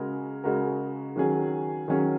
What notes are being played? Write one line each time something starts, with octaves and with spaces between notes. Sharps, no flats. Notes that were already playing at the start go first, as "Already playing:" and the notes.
Already playing: C#3 G#3 F#4 A#4
C#3 G#3 F#4 A#4
D#3 F#3 C#4 G#4
D#3 F#3 C#4 G#4